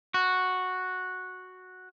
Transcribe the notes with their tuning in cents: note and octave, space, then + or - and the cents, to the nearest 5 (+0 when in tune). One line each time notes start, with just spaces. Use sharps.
F#4 -5